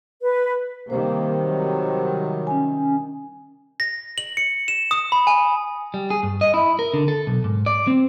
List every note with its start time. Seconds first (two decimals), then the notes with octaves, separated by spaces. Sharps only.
0.22 B4
0.90 C3 D#3 G3 A#3 C5
1.44 F#3
2.47 C#4 G#5
3.80 A#6
4.18 F#7
4.37 C#7
4.68 E7
4.91 D#6
5.12 B5
5.27 G#5
5.94 G3
6.10 G#4
6.23 G2
6.41 D#5
6.54 E4
6.79 A#4
6.94 D3
7.08 A4
7.27 B1
7.44 G#2
7.66 D5
7.87 C4